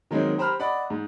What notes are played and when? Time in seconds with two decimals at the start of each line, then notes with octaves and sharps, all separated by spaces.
0.11 D#3 F#3 G#3 A#3 C4 D#4
0.38 G4 C5 A#5 B5 F6
0.60 D5 D#5 F#5 B5
0.90 G#2